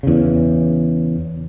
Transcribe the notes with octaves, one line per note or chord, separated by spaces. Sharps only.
E2 C#3